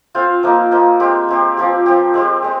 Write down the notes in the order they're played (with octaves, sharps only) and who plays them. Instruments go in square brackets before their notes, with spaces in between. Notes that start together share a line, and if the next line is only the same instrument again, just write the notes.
[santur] C4 F4 C5 F5
F3 A#3 D#4
F3 A#3 D#4
G#3 C4 G4
G#3 C4 G4
F3 C4 G4
F3 C4 G4
G#3 C4 G4
G#3 C4